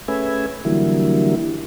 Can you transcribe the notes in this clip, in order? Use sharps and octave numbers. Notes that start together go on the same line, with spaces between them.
A3 C#4 G#4 B4 E5 G#5
D3 E3 F#3 G3 A#3 E4